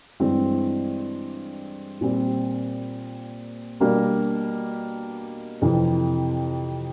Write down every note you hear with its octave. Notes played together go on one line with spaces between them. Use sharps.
G2 E3 G#3 C4
A#2 G3 C4
B2 G3 A#3 D4
F2 C3 E3